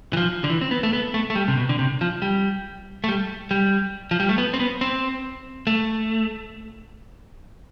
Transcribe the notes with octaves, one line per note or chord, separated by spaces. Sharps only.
E3
F3
D3
E3
C4
B3
A3
B3
A3
A3
G3
C3
B2
D3
C3
F3
G3
A3
G3
G3
F3
G3
A3
B3
C4
B3
C4
A3